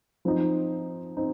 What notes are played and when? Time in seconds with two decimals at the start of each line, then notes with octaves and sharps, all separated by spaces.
0.25 F3 C4 D#4
1.17 C4 D#4